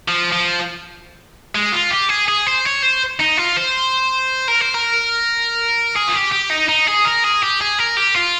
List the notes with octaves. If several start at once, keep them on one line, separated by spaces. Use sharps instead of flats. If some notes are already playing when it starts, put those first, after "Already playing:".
F3
F3
G#3
F4
G4
G#4
G#4
C5
C#5
C5
D#4
F4
C5
A#4
C5
A#4
G#4
F4
G4
G4
D#4
D#4
G#4
A#4
G#4
G4
G#4
A#4
G4
F4